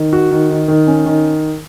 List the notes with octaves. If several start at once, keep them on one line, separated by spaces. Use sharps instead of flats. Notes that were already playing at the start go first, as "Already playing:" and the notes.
Already playing: D#3
F#4
D#3
D#3
D#3
C#4
D#3